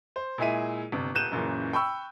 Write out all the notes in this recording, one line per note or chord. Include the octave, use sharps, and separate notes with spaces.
C5
A#2 G#3 E4 G#4 E5 D#7
G1 C3
D#1 F#6 G6 D#7 E7
F#1 F#2 A#2 C#3 E3
G5 B5 C#6 E6